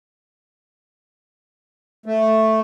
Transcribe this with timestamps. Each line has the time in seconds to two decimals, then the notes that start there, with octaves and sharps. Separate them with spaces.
2.06 A3